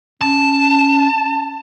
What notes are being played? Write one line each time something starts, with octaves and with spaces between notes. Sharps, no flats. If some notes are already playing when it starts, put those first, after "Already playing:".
C#4 A5